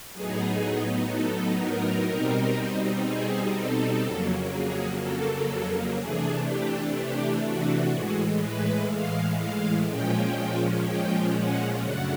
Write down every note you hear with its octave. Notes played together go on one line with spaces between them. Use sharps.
A2 F#3 B3 D#4 G#4
A4
A#4
B2 G3 C4 D#4
G#4
A4
F2 C#3 F#3 A#3
G#4
A4
C3 E3 A3 D4 G#4
G4
G4
F#4
A2 E3 G#3
B4
F5
F5
A#2 F3 G#3 C#4 G5
G5
F#5
F#2 C#3 F#3 A3 D4 F#5